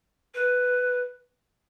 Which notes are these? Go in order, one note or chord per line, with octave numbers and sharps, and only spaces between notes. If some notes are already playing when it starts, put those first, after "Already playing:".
B4